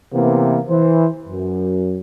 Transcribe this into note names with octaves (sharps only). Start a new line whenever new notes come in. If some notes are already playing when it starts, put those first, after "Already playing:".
C3 E3 A#3 B3
E3 C5
F#2